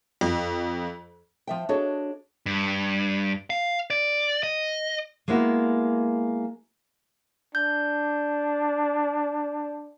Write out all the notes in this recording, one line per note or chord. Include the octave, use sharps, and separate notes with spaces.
F2
F3 E5 G5
D4 F#4 G#4 A4 C#5 D#5
G2
F5
D5
D#5
G#3 A#3 B3 E4 F#4
D4 G6